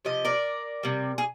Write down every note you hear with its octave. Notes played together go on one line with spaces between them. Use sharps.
C3 F3 D#5
A#4 D5
C3 G3
G#4